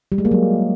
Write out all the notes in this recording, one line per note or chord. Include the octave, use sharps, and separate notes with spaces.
G3
G#3
A#3
F#3